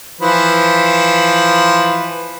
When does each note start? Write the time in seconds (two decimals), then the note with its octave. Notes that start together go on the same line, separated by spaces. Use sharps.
0.21 E3 F3 B4